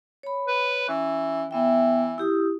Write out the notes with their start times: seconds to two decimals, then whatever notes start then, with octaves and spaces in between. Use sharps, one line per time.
0.23 C#5 B5
0.47 B4
0.89 E3 C#4
1.51 E3 B3 E5 G5
2.18 E4 G4 D#6